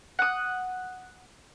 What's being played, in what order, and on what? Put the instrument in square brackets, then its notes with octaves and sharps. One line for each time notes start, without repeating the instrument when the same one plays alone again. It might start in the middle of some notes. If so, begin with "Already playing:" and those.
[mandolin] F#5 D#6